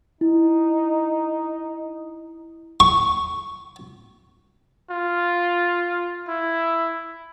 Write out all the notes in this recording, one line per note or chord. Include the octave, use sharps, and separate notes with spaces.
D#4 E4
C#6
F4
E4